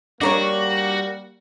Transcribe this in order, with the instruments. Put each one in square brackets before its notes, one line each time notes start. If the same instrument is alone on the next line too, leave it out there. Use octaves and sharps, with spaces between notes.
[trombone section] G3 A#3 [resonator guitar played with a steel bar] D4 A#4 C#5 [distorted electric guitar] F#4